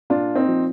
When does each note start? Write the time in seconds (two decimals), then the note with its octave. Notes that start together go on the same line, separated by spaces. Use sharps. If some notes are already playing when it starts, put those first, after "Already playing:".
0.10 A#2 D4 F4
0.35 C4 D#4
0.48 F3